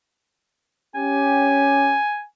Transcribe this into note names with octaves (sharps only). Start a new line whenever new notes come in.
C#4 G4 G#5